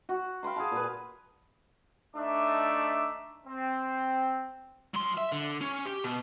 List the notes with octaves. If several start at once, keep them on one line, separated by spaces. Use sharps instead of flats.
F#4
F5 G5 B5 C6
G#4 F5 A5
A#2 B4
A3 D4 D#4 E5 D6
C4
F#3 C6
E5
D3
C#4
G4
B2